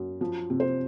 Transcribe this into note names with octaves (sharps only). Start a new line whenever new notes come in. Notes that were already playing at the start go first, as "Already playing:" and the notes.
Already playing: F#2
F3
C3
C5